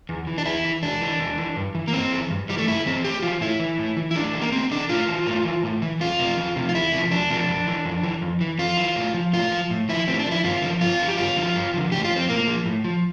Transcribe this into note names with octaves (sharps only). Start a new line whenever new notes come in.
E2
E3
D4
E2 E4
E3
E2 D4
E3
E2
E3
G2
E3
A#3
G2 C4
E3
G2
E3 G3
A3
G2 E4
E3 C4
A2 G4
E3 F4
A2 E4
E3
A2
E3
E4
A2 D4
E3
A#3
A2 C4
E3 D4
A2 F4
E3
A2
E3
A2
E3
E2 F4
C3 F3
E2
C3 F3
F4
E2 E4
C3 F3
E2 D4
C3 F3
F2
E3
F2
E3
F2
E3
F2 F4
E3
A2
F3
A2 F4
F3
A2
F3 E4
A2 C4
E4
D4
F3
E4
G2 F4
D3 F3
G2 F4
D3 F3
G4
G2 F4
D3 F3
G2
D3 F3
A2 G4
F4
F3
C4
A2 A#3
F3
A2
F3